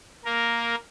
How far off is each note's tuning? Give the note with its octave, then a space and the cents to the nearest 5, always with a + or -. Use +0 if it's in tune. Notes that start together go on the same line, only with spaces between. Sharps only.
A#3 +0 A#4 +5